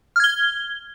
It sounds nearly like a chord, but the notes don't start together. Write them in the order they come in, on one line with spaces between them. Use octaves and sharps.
F6 G#6 G7